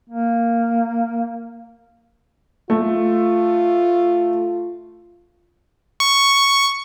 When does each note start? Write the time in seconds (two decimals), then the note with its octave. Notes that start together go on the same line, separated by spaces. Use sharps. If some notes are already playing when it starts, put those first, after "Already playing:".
0.10 A#3
2.70 A3 F4
6.00 C#6